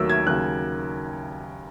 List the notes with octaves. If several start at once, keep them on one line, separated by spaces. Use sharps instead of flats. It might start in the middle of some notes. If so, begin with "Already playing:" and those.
Already playing: D#2 D#3 F#3 A3 E6
G#6
D#2 C#3 F#3 F#6